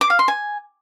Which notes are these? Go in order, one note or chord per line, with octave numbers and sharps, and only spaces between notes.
D6
F5
C6
G#5